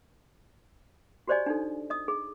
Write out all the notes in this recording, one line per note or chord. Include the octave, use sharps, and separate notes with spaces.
F#4 G4 C5 D5 D#5 G#5
D4 D#4 A4
D#5 D#6
G#4